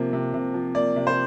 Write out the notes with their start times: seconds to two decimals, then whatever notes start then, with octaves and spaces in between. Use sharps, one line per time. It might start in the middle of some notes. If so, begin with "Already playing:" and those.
Already playing: C3 F3 A#3
0.13 C3
0.34 C3
0.54 F3
0.75 A#3 D5
0.96 C3
1.07 C5